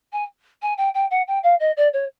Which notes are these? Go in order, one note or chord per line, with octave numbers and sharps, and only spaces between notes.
G#5
G#5
G5
G5
F#5
G5
F5
D#5
D5
C#5